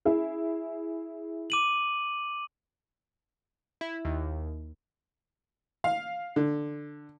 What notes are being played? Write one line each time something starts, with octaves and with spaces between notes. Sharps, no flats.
E4 G#4
D6 D#7 F#7
E4
D#2
F5
D3